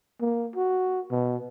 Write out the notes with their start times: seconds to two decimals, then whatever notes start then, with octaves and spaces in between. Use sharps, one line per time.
0.21 A#3
0.56 F#4
1.11 B2